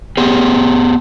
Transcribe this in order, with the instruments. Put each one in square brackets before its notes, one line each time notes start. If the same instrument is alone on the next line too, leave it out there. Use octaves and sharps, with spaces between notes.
[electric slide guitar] B3 G4 G#4